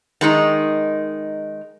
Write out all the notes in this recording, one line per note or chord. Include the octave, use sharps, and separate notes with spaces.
D#3 G#3 D#4